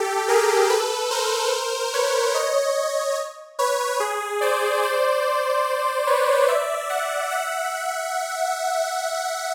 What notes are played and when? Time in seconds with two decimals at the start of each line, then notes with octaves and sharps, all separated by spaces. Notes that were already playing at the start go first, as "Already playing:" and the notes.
Already playing: G4 A4
0.28 G#4 A#4
0.69 A4 B4
1.11 A#4 C5
1.93 B4 C#5
2.34 C#5 D#5
3.59 B4 C#5
4.00 G#4
4.41 C5 D5
4.83 C5 D5
6.06 B4 C#5
6.48 D5 E5
6.89 E5 F#5
7.31 E5 F#5